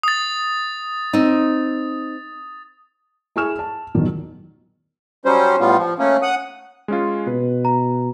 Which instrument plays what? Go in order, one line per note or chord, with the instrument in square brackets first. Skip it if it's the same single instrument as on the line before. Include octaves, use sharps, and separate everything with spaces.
[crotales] D#6 A6
[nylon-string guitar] C4 D#4
[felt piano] E4 G#4 G#5 C#6 F6 E7
A5
A1 E2 B2 D#3 F#3
[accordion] F#3 G3 C#4 C5
A2 G3 B3 F4
F3
A3 A#3 C#4
F#5 D#6
[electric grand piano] G#3 C#4 F4
[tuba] B2 [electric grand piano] B4
[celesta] A#5